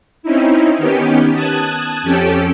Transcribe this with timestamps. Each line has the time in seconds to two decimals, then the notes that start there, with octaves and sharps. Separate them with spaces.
0.23 C4 C#4 D#4 E4
0.78 D#3 B3 C#4 G4
1.33 A5 D#6 F#6 G#6
2.03 F2 C#4 G4 A4 G5